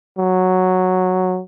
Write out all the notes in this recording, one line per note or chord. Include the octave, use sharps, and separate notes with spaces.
F#3